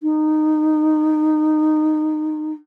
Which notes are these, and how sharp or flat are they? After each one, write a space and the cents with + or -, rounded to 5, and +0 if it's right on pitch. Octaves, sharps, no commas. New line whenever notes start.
D#4 -15